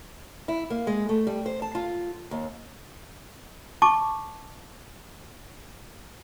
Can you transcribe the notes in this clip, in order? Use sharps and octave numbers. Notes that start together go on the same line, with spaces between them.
E4
A#3
G#3
A3
G3
C5
A5
F4
D#2
A5 C#6 D6